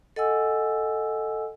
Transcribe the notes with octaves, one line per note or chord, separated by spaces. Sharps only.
A4 D#5 F#5 G#5 E6